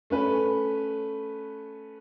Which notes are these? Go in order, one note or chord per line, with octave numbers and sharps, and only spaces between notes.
A3 C#4 B4